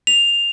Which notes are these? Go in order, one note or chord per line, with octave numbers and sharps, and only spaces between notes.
F7